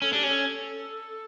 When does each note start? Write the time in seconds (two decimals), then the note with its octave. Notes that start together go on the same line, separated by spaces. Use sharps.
0.02 C#4 A4
0.13 D4 G4
0.23 C#4 A4